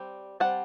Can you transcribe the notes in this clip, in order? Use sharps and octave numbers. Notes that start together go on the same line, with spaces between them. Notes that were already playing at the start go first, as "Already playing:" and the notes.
Already playing: G3 C4
G3 C4 F#5 A5